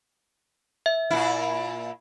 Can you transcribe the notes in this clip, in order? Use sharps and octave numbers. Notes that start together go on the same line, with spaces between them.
E5
A#2 E4